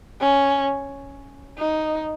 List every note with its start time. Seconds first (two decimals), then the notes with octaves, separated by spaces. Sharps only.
0.21 C#4
1.58 D#4